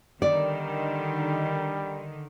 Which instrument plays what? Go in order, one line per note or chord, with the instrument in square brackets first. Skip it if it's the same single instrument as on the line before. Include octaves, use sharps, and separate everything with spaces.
[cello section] D3 D#3 [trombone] G3 [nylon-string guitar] D5